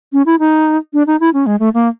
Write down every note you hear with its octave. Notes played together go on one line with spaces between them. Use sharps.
C#4
E4
D#4
D4
D#4
E4
C#4
G#3
A3
A#3